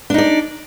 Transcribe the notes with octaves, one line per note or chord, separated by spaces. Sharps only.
D4 D#4 D5